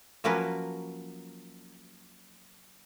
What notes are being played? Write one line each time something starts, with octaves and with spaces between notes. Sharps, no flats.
F3 F#3 A#3 C#4 A#4 B4